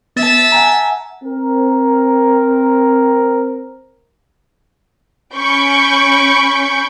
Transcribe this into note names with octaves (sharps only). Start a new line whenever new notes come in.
B3 E5 A5 A6
F#5 G#5 A#5
C4 A#4
C#4 B5 C#6 G6 D7